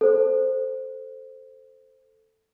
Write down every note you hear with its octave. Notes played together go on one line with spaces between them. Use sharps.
A4 C5